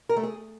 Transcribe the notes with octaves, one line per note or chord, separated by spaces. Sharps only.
A#4
A3
G#4